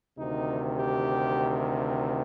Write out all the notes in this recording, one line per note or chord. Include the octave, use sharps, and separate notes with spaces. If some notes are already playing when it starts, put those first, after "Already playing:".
D2 C3 D#3 D#4
G4